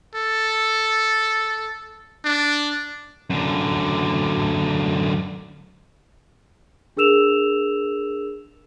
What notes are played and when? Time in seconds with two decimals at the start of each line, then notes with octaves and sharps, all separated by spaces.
0.15 A4
2.25 D4
3.30 F#2 D3
6.97 D4 G#4 A#4 E6 E7 F7